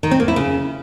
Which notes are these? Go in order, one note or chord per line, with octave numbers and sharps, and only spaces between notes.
D#3
C4
A#3
E4
C#3